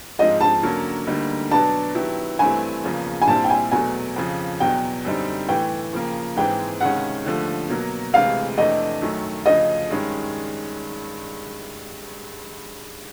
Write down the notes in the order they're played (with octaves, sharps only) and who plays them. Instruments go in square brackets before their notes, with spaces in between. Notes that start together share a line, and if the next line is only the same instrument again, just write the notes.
[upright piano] G#2 F3 G#3 C4 F4 [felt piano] D#5
[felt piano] A5
[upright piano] D3 F#3 A#3 C#4
D2 D3 G3 A#3 D#4
[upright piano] B2 F#3 B3 D4 [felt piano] A5
[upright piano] D#3 F#3 B3 E4 G4
[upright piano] G2 E3 A3 C4 E4 [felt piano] G#5
[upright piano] E2 C#3 F3 A#3
[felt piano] G#5
[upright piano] A#2 G3 C4 E4 [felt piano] A5
[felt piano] G5
G#5
[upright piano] E2 B2 F#3 A3 [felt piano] G#5
[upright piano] F2 C#3 F3
[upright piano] E2 B2 F#3 [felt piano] G5
[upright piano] F#2 D3 G3 C4 D#4
[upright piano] A2 E3 A3 [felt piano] G5
[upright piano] C#3 F3 A#3
[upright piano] G#2 E3 G#3 C4 [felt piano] G5
[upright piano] C#2 C3 D#3 G#3 C#4 [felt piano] F#5
[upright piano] D#2 D3 F3 A3
B2 F#3 A#3
[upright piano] D2 C3 E3 G#3 [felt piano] F5
[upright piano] F2 C3 E3 A3 D4 [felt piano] D#5
[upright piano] F#2 D#3 F#3 A3
[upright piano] D2 C#3 F3 [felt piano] D#5
[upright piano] G2 D#3 G#3 C#4